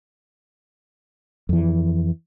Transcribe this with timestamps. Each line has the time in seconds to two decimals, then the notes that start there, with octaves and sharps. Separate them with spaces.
1.49 F2 E3